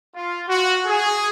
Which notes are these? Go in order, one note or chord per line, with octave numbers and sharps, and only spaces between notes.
F4
F#4
G#4